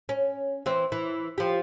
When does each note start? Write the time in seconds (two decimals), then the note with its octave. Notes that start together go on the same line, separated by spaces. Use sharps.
0.09 C#4
0.66 E3 C4
0.92 E3
1.38 F3 G4